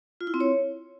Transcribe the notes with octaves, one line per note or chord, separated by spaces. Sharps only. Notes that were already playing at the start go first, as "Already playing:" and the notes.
F4
E4
C4
C#5